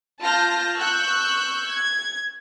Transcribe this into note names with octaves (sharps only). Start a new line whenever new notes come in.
F4 A5 F6 G6 A#6
C#6 E6 F#6 G6
G#6